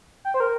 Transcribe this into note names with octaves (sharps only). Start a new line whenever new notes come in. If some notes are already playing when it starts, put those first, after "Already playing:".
G5
C5
A#4